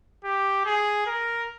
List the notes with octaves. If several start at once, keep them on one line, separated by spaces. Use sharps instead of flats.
G4
G#4
A#4